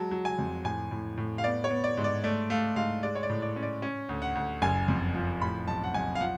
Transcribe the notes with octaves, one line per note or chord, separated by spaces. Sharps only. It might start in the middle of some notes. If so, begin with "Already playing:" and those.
Already playing: F#3 G#3 A5
F#3
G#5
F2
A2 G#5
A2
A2
F5
B3 D5
C#5
B3
D5
G#2
D5
A3 D5
A3 F5
G#2 F5
G#3 D5
C#5
D5
A2
D5
C#4
D5
C#4
D2
F#5
D2
F#1 G#5
F2
F3
A2 B5
B1 A5
F#5
B1 G#5
F5
F3 F#5